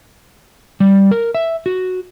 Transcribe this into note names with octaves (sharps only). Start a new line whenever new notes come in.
G3
A#4
E5
F#4